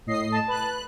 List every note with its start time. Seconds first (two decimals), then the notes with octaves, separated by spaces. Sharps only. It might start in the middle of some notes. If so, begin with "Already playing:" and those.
0.07 A2 D#5 C7
0.32 A5
0.48 B4 F#6